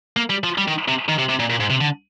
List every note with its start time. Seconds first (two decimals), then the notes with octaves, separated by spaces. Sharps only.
0.17 A#3
0.30 G3
0.44 F3
0.58 G3
0.68 D#3
0.88 C3
1.09 D#3
1.19 C3
1.29 C3
1.40 A#2
1.50 A#2
1.60 G#2
1.70 C3
1.81 D3